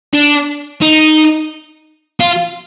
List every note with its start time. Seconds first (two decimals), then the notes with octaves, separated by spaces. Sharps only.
0.14 D4
0.82 D#4
2.20 F4